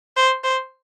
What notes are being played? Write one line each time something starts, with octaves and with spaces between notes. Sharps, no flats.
C5
C5